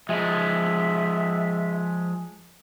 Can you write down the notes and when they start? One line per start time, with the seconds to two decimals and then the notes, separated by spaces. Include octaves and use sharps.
0.09 F3 G#3 E5